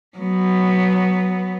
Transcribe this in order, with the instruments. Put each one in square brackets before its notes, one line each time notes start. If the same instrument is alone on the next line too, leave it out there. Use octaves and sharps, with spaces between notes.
[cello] F#3 B3